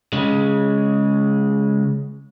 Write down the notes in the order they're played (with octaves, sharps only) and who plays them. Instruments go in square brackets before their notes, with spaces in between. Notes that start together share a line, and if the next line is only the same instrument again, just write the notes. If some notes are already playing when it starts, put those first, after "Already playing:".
[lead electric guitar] C#3 G#3